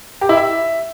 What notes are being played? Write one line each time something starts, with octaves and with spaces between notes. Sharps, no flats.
G4
E4
E5